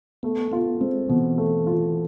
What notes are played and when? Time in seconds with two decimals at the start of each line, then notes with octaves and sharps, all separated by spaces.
0.23 A3 B3
0.52 B3 F4
0.80 G#3 C4
1.09 B2 E3
1.38 A3
1.67 F4